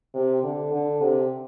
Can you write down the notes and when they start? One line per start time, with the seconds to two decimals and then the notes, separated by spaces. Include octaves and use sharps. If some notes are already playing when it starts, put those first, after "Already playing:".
0.15 C3
0.43 D3
0.73 D3
1.01 C3